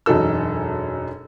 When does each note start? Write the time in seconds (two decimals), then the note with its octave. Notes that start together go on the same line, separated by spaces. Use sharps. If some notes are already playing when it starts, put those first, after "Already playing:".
0.06 E1 F#2 D#4 A4 E6